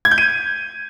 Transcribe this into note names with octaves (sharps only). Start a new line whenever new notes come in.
G#6
G6
D#7